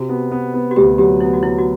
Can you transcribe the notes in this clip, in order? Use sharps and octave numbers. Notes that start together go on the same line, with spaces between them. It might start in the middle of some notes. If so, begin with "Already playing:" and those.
Already playing: C3 F#4
B3
B3
B3
F#4
D2 G4
F#3 G4
B3 E4
F#4
F#3 E4
F#4